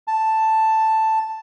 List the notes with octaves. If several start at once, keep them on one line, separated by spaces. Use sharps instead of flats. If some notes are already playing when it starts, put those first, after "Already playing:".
A5